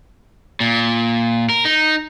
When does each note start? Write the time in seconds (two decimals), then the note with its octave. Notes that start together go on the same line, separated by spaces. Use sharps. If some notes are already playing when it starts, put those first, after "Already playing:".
0.60 A#2
1.49 A#4
1.65 D#4